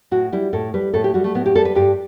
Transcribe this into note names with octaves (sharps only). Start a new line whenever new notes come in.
A2 F#4
G3 E4
A2 A4
G3 B4
A2 A4
G4
G3 F#4
A3
A2 B3
G4
G3 A4
B4
G2 G4